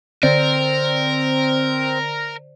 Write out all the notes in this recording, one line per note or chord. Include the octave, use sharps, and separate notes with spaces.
D3 C4 A#4 C5 D5